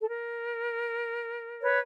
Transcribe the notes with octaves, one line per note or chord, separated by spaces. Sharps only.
A4
A#4
B4 C#5